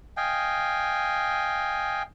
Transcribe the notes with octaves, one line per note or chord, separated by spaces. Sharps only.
D#5 F5 G5 G#5